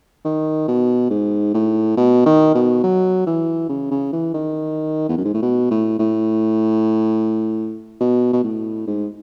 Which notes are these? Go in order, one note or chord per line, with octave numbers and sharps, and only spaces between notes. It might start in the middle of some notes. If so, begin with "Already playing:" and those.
D#3
B2
G#2
A2
B2
D#3
B2
F#3
E3
C#3
C#3
E3
D#3
E2
F#2
G#2
A2
B2
A2
A2
B2
B2
A2
G#2